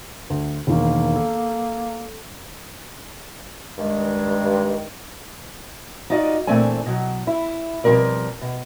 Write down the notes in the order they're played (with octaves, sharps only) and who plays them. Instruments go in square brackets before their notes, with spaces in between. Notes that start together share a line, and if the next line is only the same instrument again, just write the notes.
[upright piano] D2
[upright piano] E1 D#3 [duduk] A#3
[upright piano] A4
[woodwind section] G2 D#3 G#3
[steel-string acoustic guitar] D#4 F4 F#4 D5 D#5
A#2 E3 A3 C4 D4 G#5
B2 F#3
E4
B2 F3 G3 C4 A#4 D5
B2